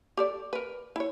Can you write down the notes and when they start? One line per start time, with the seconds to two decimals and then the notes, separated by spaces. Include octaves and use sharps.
0.17 G4 A4 D5
0.53 A#4 B4
0.96 E4 C#5